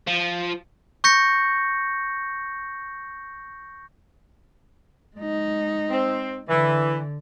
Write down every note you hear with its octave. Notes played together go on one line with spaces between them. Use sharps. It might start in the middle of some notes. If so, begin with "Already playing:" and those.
F3
C#6 G6 A#6 C#7
G#3 D#4
C4
D3 E3